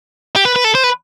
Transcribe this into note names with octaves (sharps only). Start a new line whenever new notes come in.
G4
B4
B4
A4
C5
B4